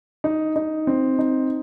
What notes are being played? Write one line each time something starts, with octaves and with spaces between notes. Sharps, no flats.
D#4
D#4
C4
D#4